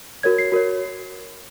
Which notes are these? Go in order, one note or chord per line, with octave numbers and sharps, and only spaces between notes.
F#4 A#4 C#5 G#6
C7
F#4 A#4 C#5